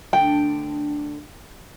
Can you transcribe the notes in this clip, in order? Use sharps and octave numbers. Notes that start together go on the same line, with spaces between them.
D2 D3 D4 G5